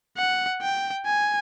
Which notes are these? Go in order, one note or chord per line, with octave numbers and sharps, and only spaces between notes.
F#5
G5
G#5